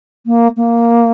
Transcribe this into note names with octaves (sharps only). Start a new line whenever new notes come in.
A#3
A#3